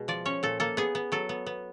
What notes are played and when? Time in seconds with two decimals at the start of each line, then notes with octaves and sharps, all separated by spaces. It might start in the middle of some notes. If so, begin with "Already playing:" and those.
Already playing: B2 G#3
0.08 F3 D5
0.25 C#4 C#5
0.43 A#2 A4
0.60 A#3 A4
0.77 B3 G#4
0.95 B3
1.12 F#3 A4
1.29 B3
1.47 B3